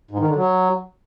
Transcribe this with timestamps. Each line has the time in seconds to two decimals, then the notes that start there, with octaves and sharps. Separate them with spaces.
0.11 G#2
0.19 D#3
0.28 D3
0.36 F#3